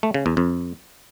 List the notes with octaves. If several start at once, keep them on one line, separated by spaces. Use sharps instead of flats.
A3
C#3
E2
F2